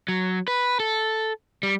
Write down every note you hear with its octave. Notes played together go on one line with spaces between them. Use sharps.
F#3
B4
A4
G3